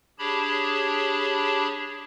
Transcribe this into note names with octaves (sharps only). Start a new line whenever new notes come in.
D4 G4 G#4 C#5 A5 B5